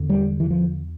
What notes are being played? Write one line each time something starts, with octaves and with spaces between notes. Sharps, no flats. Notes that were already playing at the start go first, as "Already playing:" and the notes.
Already playing: E2 D3
G3
E3
F3